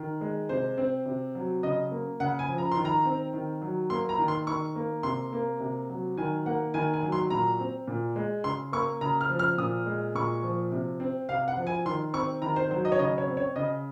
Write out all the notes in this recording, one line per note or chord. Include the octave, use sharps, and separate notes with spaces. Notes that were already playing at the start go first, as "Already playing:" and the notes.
Already playing: D#3
G#3
C3 C5
C4
C3
F#3
C#3 D#5
A#3
C#3 F#5
G#5
F3
A#5
C6
D#3
A#5
C4
D#3
F#3
A#3 C6
A#5
D#3
C6
D#3 C#6
A#3
C3 C6
A#3
C3
F#3
D#3 G#5
A#3 F#5
D#3 G#5
G#5
F#3
C6
A#2 A#5
C4
A#2
G#3
C#3 C6
A#3 C#6
C#3 A#5
F6
F3
F6
A#2 D#6
G#3
A#2 C#6
F3
C3
C4
C3 F5
F#5
F3
G#5
D#3 C6
C4 C#6
D#3 A#5
C5
F#3 C5
D#5
C#5
C#3 D#5
C#5
C4
C#5
C#3 D#5